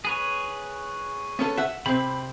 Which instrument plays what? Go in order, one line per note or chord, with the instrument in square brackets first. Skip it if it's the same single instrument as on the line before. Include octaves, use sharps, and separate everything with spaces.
[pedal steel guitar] G#4 B4 C#5
[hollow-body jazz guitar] B3 C#4 A4
E5 F#5
[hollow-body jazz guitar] C3 C4 [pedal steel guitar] B5